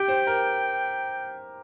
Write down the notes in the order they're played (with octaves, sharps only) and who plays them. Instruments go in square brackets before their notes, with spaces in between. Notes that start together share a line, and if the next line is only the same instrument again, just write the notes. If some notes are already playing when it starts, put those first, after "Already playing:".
Already playing: [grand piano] G4 [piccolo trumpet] G5
[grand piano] C5
A#4